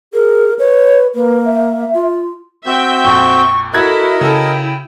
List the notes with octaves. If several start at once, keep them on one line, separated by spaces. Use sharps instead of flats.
G#4 A#4
B4 C#5
A#3 B4
E5
F4
C4 F#4 E5 G5 G6
A#1 F2 C#6
E4 F#4 A4 A#4 D#5 E5 F#6 G#6
C#3 E4 A4 G5